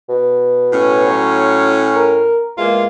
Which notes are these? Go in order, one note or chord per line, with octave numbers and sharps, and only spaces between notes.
B2
A2 C#4
F#3
A#4
E2 G#3 A#3 F4